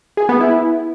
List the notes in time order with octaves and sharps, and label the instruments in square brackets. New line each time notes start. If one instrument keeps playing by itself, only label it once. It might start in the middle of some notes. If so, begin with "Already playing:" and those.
[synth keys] G#4
B3
E4